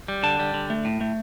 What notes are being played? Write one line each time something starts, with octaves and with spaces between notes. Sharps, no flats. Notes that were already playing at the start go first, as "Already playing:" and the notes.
G3
D3 A5
G3
D3
A3
A2
A3